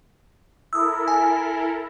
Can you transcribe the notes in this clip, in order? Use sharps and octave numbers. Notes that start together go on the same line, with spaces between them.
E4 A4 A#4 D#6 E6
G#5